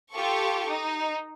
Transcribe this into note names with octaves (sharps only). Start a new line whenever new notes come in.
F4 G4 A4 C#6
D#4